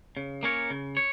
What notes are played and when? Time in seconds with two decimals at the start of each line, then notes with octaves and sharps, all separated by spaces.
0.17 C#3
0.43 A#3 C#4 A#4 C#5
0.70 C#3
0.97 C#5